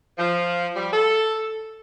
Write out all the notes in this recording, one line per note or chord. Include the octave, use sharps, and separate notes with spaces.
F3
G3
A4